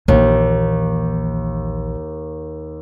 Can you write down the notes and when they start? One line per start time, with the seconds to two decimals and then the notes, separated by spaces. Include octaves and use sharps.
0.08 A#1 D#2 E3